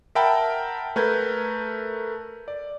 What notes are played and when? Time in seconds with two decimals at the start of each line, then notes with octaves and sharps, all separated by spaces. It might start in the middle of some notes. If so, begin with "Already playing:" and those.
0.15 A#4 E5 F#5 G5 A5 B5
0.96 A3 A#4 B4 G6 G#6
2.48 D5